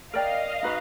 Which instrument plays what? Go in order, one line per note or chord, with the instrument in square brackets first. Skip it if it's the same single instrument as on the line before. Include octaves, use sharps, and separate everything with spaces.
[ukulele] A#4 D5 G5 [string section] D#5 F5
[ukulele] D#4 F#4 B4